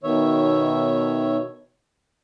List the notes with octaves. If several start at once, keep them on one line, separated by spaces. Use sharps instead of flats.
B2 D#3 C#5 E5